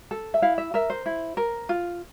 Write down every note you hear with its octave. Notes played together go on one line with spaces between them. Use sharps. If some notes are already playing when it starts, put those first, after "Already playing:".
A4
E5
E4 F5
E5
A#4 E5
C5
E4
A#4
F4